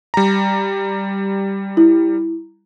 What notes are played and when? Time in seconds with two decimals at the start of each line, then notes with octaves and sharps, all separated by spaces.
0.14 G3 A#5
1.77 E4